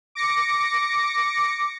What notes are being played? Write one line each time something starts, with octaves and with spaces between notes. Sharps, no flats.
D6 A#6 C#7